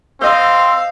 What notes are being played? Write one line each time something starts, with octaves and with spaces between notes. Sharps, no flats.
C4 C5 D#5 F5 E6